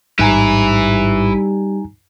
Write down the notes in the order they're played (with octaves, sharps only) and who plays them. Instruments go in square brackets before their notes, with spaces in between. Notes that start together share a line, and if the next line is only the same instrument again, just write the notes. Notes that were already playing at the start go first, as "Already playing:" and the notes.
[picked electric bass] A1 G#2 [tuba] G3 [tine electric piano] D#4 G#5 A#5 [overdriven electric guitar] E4 B4